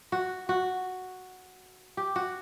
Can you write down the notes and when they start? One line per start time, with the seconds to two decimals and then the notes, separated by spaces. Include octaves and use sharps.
0.12 F#4
0.49 F#4
1.97 G4
2.16 F#4